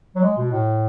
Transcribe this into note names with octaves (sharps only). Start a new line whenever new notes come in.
F#3
G#3
B2
A2